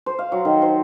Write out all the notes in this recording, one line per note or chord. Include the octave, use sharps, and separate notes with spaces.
C5
F5
F#3
D#3
C5